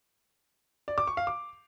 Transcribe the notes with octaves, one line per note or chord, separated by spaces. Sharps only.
D5
D6
C#6
F5
D6